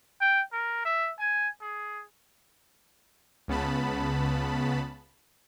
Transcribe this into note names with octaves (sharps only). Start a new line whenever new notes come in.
G5
A#4
E5
G#5
G#4
C#2 C#3 B3 A5 B5